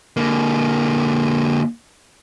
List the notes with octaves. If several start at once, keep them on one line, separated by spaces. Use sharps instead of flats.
D3 A#3